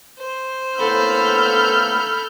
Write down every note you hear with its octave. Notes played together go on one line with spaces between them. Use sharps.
C5
A2 A#3 B3 A4 B5 E6 F6 G6